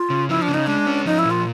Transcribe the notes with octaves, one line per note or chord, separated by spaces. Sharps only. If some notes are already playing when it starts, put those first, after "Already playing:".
Already playing: F4
C#3
F3 E4
D4
C#3
D#4
G#3 D4
C#4
F3 D#4
E4
A#2
F4